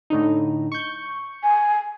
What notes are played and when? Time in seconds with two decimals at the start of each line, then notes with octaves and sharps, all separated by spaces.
0.10 A2 D3 D#4
0.72 C#6 G6
1.43 G#5